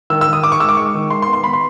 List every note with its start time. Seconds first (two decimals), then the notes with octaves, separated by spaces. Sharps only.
0.10 D#3 E6
0.21 E6
0.27 D#3
0.33 D#6
0.44 D#3 D6
0.52 C#6
0.60 G#3 E6
0.69 D6
0.77 G#3 C#6
0.95 D#3
1.10 G#3 C6
1.22 C6
1.28 B3
1.33 C6
1.44 B3 B5
1.53 C6